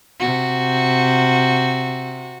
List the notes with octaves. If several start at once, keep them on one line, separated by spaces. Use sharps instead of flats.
C3 F#4